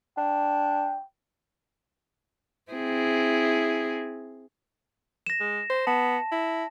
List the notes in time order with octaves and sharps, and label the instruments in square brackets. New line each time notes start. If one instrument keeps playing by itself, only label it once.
[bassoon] D4 [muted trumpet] G5
[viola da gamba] C4 E4 G#4
[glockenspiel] A#6 E7
[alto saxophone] G#3
C5
[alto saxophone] B3 [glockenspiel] A5
[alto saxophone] E4